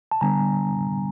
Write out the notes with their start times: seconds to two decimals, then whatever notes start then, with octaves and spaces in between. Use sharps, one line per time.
0.11 A5
0.21 D3 G3 B3 D4 G#5 A#5